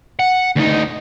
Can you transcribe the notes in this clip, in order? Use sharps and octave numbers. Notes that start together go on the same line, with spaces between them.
F#5
D2 D#4